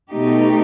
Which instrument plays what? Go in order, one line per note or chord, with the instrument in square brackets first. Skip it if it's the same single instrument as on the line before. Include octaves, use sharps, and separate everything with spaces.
[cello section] B2 A3 D#4 G4